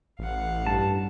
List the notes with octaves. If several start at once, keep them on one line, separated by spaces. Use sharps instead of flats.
A1 F5 F#5
G2 A5